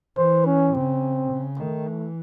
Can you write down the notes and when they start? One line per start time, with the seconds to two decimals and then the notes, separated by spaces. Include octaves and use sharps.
0.17 E3 C5
0.45 C#4
0.74 C#3 C4
1.31 C#3
1.59 D#3 A3
1.89 E3